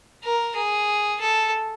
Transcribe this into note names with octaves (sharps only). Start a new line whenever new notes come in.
A#4
G#4
A4